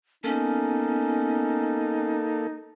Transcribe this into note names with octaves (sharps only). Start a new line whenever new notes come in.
A#3 B3 C#4 D#4 A4